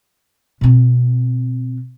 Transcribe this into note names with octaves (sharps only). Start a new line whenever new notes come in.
B2 C4